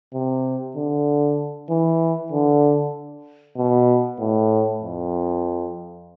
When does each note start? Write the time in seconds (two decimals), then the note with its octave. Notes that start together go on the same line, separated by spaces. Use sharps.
0.14 C3
0.76 D3
1.70 E3
2.32 D3
3.58 B2
4.20 A2
4.83 F2